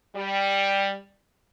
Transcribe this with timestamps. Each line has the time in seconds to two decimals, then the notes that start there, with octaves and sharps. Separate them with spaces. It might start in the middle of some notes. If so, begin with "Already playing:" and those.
0.15 G3